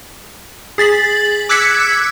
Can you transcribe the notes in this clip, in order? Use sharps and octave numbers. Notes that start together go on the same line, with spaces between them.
G#4 A6 B6 F#7
D6 E6 F#6 G#6 B6 C#7